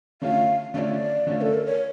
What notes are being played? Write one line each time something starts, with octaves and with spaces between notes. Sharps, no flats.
D3 A3 C#4 F4 F5
D3 A3 C#4 F4 D5 F5
D3 A3 C#4 F4
A4
A#4
C#5